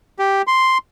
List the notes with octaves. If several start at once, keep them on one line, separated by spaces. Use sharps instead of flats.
G4
C6